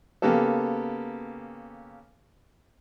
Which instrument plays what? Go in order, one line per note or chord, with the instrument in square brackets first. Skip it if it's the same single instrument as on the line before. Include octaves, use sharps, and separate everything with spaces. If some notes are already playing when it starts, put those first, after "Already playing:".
[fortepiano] C#3 A#3 B3 G4 A4